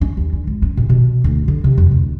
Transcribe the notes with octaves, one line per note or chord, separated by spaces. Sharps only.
C#4
D#2
D3
G#1
C#4
A#2
B2
D2
D3
C3
F2
D2